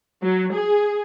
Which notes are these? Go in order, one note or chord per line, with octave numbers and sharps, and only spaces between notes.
F#3
G#4